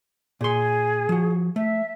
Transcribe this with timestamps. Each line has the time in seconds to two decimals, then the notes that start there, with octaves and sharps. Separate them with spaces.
0.41 A#2 G#4 C6
1.09 F3 F#4
1.56 A3 E5